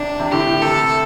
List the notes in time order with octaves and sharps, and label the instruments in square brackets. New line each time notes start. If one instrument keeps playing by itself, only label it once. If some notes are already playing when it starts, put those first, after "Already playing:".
Already playing: [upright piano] C3 [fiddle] D4
[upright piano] C3
[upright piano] A2 D3 [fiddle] G4
[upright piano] A2
[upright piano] C3 [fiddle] A4